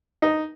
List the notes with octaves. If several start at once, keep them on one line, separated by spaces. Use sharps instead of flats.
D#4